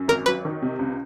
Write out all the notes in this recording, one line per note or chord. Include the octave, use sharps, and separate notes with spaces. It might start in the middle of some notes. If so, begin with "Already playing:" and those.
Already playing: F#2
G#1 A#4
F#3 B4
D#3
C3
C#2